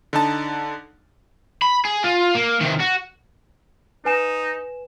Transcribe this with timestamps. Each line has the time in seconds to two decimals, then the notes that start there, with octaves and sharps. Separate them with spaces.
0.13 D3 D#4 A5
1.62 B5
1.85 G#4
2.04 F4
2.35 A#3
2.60 C3 D#3
2.80 F#4
4.05 D#4 B4 G#5 E7